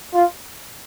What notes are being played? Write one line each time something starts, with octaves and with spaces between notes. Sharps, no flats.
F4